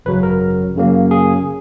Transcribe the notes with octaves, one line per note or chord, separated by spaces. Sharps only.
G#1 F#2 C#3 F#3 B4
A#4
F#2 C#3 F#3 A#3
G#4